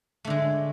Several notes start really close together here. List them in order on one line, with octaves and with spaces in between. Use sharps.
A3 D3 G#3